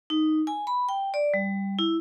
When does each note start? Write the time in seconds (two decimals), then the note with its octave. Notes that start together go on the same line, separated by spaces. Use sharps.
0.10 D#4
0.47 G#5
0.67 B5
0.89 G5
1.14 D5
1.34 G3
1.79 E4